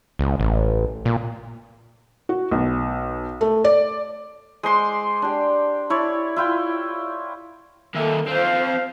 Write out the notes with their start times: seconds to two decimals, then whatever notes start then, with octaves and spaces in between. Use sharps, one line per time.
0.19 C#2
0.40 A1
1.05 A#2
2.29 F#4
2.51 B1
3.41 A3
3.64 D5
4.63 G#3 C5 C6 D6
5.22 D4 G4
5.90 E4 C#5 D5
6.36 E4 F4 G5
7.95 D#3 A#3 A4 E5
8.28 C4 F4 C5 F5